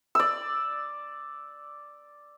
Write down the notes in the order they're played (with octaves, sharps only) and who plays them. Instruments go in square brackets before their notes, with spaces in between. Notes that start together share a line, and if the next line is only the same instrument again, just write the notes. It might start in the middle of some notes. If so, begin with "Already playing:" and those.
[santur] D5 E6